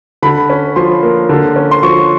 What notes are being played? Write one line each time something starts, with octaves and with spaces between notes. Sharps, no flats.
D3 B5
C#4
F3 C6
A#3
D3
C#4
C6
F3 C#6